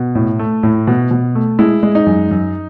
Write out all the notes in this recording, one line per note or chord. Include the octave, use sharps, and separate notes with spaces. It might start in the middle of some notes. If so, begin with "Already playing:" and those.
Already playing: B2
A2
A3
A2
B2
B2
A3
G#3 E4
G#3
D#4
F#2
F#2